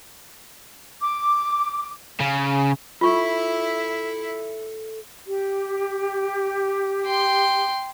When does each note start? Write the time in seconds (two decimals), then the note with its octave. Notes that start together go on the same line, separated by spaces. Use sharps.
1.01 D6
2.20 C#3
3.01 E4 F4 A4 E5 C#6
5.26 G4
7.05 G5 C6